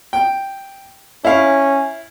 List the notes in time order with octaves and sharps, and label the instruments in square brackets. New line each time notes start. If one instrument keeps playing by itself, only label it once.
[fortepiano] G5
[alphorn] C#4 [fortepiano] E4 F5